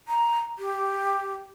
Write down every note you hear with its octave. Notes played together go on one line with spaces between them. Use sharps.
A#5
G4